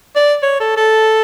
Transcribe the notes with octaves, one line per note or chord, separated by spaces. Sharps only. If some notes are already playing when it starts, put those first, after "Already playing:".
D5
C#5
A4
A4